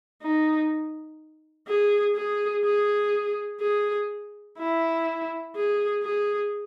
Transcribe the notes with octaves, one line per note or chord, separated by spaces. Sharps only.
D#4
G#4
G#4
G#4
G#4
E4
G#4
G#4